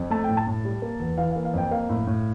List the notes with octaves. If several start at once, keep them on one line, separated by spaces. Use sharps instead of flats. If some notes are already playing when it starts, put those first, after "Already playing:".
Already playing: F2
A3 A5
A2 G5
A5
A2
G3
A#3
E2
E3 F5
F5
A#3
F5
F2 G5
A#3 F5
A2
A2